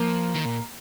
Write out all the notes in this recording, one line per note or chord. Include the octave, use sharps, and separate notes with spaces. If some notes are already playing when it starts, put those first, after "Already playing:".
Already playing: F3 A#3
D#3
A#2